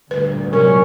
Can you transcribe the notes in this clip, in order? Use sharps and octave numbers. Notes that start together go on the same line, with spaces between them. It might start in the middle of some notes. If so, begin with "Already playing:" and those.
D2 G2 A#2 B4
C3 F#3 G#3 C#4 A#4